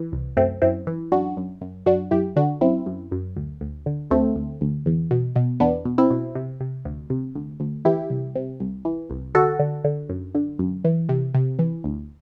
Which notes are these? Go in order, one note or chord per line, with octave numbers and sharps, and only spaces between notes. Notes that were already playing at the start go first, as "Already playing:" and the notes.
Already playing: E3
C2
F#2 A3 C4
F#2 C4 E4
E3
F#2 D4 F#4
F#2
F#2
F#2 D4 F#4
F#2 E4 G4
D3 D4 F#4
F#2 C4 E4
F#2
F#2
D2
D2
D3
D2 A3 C4
D2
D2
E2
B2
B2
E2 B3 D4
B2
C4 E4
B2
C3
C3
D2
C3
D2
D2
E3 E4 G4
C2
C3
C2
E3
C2
D3 F#4 A4
D3
D3
F#2
D3
F#2
E3
C3
C3
E3
D2